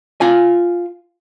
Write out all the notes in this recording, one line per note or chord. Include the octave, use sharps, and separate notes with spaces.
F4 G#5